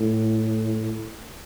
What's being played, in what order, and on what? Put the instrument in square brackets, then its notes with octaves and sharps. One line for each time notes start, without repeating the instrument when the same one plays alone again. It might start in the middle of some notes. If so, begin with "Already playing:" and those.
Already playing: [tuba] A2